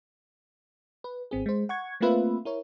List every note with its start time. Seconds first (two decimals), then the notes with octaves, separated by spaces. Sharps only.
1.04 B4
1.31 G#1 C4 G#4
1.46 G#3 C5
1.69 F#5 C#6 G#6
2.01 A3 A#3 C4 F4 B4 E5
2.45 E4 A#4 C#5